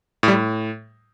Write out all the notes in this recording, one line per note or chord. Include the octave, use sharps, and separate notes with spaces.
A2
G3
A2